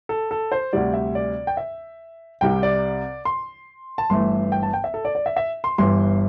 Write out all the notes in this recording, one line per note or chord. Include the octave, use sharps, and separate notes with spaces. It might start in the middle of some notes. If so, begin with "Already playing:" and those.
A4
A4
C5
D2 C3 G3 D5
E5
D5
G5
E5
C2 C3 G3 G5
D5
C6
A5
G1 G2 E3 A3 C6
G5
A5
G5
E5
A4
D5
D5
E5
E5
C6
G1 G2 E3 G3 C6